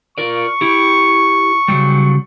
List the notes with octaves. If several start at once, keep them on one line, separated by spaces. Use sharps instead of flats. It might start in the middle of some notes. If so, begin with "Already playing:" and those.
F4 A#4 D5 C#6
E4 G4
C#3 F#3 G3